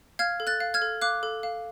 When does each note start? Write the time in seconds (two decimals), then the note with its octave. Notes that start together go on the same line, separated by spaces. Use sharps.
0.19 F5 F6 G#6
0.40 A4
0.47 F#6 A6
0.60 F5
0.74 F6 G#6
0.82 A4
1.01 F5 D6 F#6
1.23 A4
1.43 F5